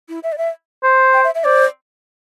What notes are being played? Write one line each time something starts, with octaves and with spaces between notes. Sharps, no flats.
E4
E5
D5
E5
C5
G5
E5
E5
C5 D5